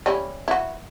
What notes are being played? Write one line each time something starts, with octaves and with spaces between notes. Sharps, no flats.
G3 C#4 E4
E4 F#4